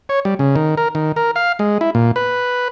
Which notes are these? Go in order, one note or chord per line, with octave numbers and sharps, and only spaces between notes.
C#5
G3
C#3
D#3
A#4
D#3
A#4
F5
G#3
E4
A#2
B4